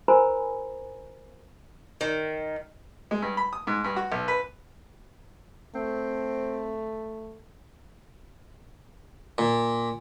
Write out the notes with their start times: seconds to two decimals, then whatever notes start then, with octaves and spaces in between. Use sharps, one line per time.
0.08 F4 A#4 C5 G#5 A#5 B5
2.01 D#3
3.11 G#3
3.22 G2
3.37 B5
3.53 D#6
3.67 G#2
3.84 G2
3.96 F#4
4.12 B1
4.28 B4
5.75 A3 C4
9.38 A#2